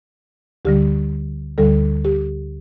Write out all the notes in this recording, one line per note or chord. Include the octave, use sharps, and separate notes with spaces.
D2 D3 G3 G4
D2 D3 G3 A4
G4